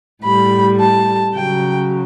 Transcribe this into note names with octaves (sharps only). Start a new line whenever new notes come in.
A2 G3 B5
A5
C#3 F#3 G5